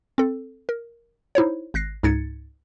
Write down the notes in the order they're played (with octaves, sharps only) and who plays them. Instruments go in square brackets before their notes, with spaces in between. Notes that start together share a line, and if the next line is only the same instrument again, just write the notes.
[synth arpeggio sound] C4 A4
A#4
D#4 E4 C5 C#5
G#1 F#6 A#6 C7
C#2 G#2 D#4 G#6 A6 C#7